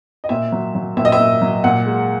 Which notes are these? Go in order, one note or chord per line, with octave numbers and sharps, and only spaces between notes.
D#5
A#2 E5
F#3
F#3
A#2 E5
D#5
E5
A#2
F#3
A#2 F#5
G#3